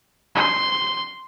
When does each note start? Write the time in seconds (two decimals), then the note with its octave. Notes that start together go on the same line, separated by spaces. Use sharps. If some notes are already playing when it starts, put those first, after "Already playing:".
0.35 C6